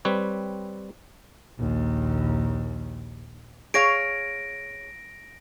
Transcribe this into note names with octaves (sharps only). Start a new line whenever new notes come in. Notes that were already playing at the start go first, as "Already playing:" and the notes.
G3 C4 B4 C#5
A#1 D#2
G#4 C#5 F5 A#6 D7